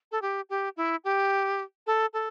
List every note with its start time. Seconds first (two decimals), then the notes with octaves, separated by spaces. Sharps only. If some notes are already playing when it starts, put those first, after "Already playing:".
0.12 A4
0.22 G4
0.50 G4
0.77 E4
1.04 G4
1.87 A4
2.13 A4